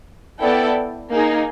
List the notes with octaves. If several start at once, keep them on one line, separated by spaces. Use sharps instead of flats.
B3 E4 A4 D5 G5
A#3 D#4 G#4